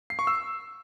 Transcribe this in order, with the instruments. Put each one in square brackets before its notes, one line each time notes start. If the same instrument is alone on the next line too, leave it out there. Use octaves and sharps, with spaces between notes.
[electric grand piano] C7
C#6
E6